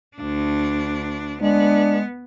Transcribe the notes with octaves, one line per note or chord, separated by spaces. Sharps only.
D2 D4
G#3 B3 D4